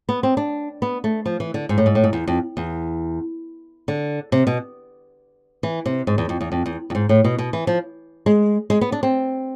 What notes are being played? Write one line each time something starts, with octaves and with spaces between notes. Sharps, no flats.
B3
C4
D4
B3
A3
F3
E3
D3
G#2
A2
G#2
A2
G#2
E2
F2
E2
D3
C3
B2
E3
C3
G#2
E2
F2
E2
F2
E2
F2
G#2
A2
B2
B2
E3
F3
G#3
G#3
B3
D4
C4